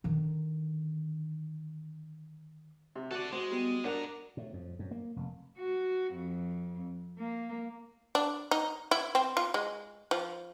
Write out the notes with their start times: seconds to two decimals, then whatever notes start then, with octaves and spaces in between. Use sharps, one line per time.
0.04 D3 D#3
2.96 C3
3.11 F#4 A4 D5
3.32 G#3 F#4 C5
3.51 G3 B3
3.84 G#2 D4 A#4 F#5 A#5
4.37 A2
4.53 F2
4.79 F#2
4.91 A#3
5.16 F1
5.57 F#4
6.13 F2
7.18 A#3
8.15 D4
8.51 D#4
8.91 E4
9.15 C4
9.37 F4
9.54 G#3
10.11 F3